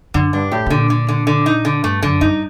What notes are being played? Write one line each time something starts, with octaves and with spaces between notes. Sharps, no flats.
F#2 D3
G2 D4
A2 G4
C3
A#2 D3
D3
D3
D3
D#4
D3
G2 A3
F#2 D3
G2 D#4